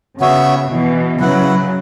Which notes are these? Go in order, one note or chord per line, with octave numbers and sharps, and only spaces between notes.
C#3 B3 F#4 C#5 E5
B2 E3
C#3 F#3 E4 B4 F#5